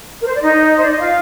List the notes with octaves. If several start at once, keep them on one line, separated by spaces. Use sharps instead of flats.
A#4
C5
D5
D#4 D#5
C5
D5
D#5
F4 F5